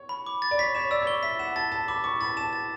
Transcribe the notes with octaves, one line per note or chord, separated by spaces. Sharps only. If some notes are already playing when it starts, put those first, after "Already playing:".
Already playing: C#5
B5
D6
A6
D5
C#5 B6
C#5 E7
D5 E6
C#5
D5 G7
E5 B6
F#5 E7
A5 A6
A5 E7
B5 D6
C#6 D6
B5 A6
A5 E7
A6